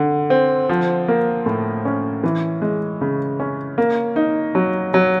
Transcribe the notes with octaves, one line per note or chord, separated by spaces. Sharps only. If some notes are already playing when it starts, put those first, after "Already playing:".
Already playing: D3
C4
F3
A#3
A2
C#4
E3
G#3
C#3
C#4
A#3
D#4
F#3
F#3